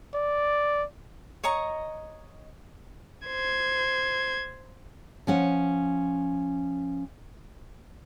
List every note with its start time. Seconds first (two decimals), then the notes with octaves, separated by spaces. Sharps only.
0.14 D5
1.44 C#5 D#5 A#5 C#6
3.27 C5 G#6
5.27 F3 C#4 F#5